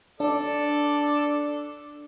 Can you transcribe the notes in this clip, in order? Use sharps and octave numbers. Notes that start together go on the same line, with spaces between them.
D4 A4 D5